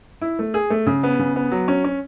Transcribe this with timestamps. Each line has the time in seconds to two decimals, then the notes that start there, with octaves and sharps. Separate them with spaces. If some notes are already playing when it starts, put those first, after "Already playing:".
0.21 E4
0.39 A3
0.54 G#4
0.70 A3
0.86 C#3
1.03 B3
1.19 C#3
1.36 B3
1.52 F#3
1.68 C#4
1.84 C#4